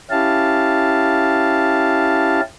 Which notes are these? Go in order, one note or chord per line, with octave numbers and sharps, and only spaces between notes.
C#4 E4 G4 F5 A5